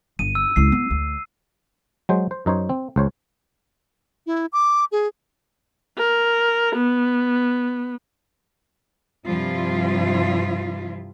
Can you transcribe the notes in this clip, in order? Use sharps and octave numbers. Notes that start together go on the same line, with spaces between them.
G1 D#7
E6
C#2 E4 C7
B3
D2
F#3 G#3 C5
C5
F#2 D#4 C5 C#5
C4
C#2 C5 C#5
E4
D6
G#4
A#4
B3
G2 C3 F3 G3 E4 F4